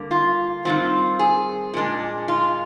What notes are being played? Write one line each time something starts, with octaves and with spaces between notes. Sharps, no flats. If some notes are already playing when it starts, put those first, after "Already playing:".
Already playing: G2 D3 G3 A#3
F4
G2 D#3 G3 C4 F4
G#4
A#2 G#3 D4
F4